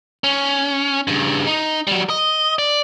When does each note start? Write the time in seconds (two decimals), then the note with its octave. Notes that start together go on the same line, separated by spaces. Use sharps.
0.24 C#4
1.07 G2 C#3
1.47 D#4
1.87 F#3 G3
2.10 D#5
2.58 D5